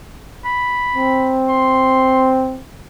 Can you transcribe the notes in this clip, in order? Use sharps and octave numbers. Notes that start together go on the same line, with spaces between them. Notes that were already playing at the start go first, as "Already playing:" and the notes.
B5
C4
C6